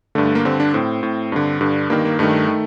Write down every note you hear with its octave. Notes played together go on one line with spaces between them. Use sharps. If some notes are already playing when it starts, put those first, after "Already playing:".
G2 D3 A3
A3
A#3
G2 D3 C4
D4
A2 C4
A2
G2 D3
G2 D3
G2 D#3 A#3
A#3
G2 D#3 A3
D#3